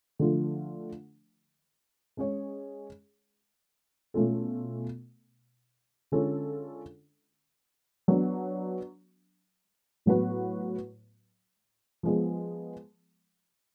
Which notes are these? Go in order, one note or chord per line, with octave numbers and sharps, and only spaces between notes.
D3 F3 A3 F4
G#3 C#4 G#4 C#5
B2 A3 C#4 F4 A4
D3 G#3 C#4 F4 A4
F#3 B3 D4
A2 F#3 B3 F#4 B4
F3 G#3 B3